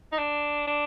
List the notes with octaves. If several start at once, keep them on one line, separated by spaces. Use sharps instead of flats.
D#4
D4
D4